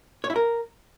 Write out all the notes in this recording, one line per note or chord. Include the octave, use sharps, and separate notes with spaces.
C#5
E4
A#4